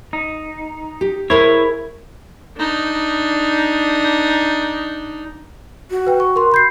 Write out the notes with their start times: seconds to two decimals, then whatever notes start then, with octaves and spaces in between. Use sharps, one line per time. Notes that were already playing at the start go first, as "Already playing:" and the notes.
0.13 D#4
1.01 G4
1.30 E4 G#4 A#4 C5 C#5
2.57 D4 D#4
5.91 F#4
6.07 B4 G5
6.20 C#6
6.36 A#4 C6
6.52 B5 G6 C7